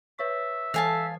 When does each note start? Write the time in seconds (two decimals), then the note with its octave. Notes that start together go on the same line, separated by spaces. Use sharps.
0.19 B4 C#5 E5 C#6
0.74 E3 A4 F5 G#5 A5 D#6